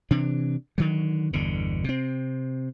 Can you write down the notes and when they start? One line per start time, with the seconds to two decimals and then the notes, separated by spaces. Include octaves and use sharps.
0.11 C3 E3 D4
0.78 D3 D#3 F#3
1.33 G1 E2 B2 D3
1.84 C3 C4